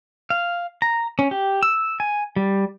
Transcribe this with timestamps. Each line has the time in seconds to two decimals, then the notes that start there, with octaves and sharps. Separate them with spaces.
0.30 F5
0.82 A#5
1.19 C#4
1.31 G4
1.63 E6
2.00 G#5
2.36 G3